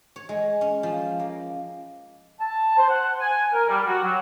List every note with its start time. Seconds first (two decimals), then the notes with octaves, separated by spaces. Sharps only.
0.16 C#5
0.29 G#3
0.61 C#4
0.83 F3
1.20 A#3
2.40 A5
2.77 C5
2.89 F#5
3.20 G#5
3.53 A#4
3.69 G3
3.87 F#4
4.03 F#3